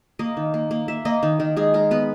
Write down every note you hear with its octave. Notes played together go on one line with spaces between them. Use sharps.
A#3 D#5
D#3
A#3
A#3
A#3 E5
A#3 D#5
D#3
D#3 A#4
G#3 G#4
G#3 A#4
B3 B4